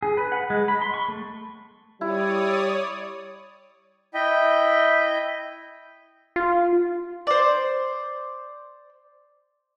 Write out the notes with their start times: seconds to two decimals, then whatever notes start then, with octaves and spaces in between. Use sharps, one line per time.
0.03 G#4
0.17 B4
0.32 F#5
0.50 G#3
0.68 B5
0.82 C6
0.94 C#6
1.08 A3
2.01 G3 E4 C#5 D5 D#6
4.14 E4 D#5 E5 G5
6.36 F4
7.27 C5 D5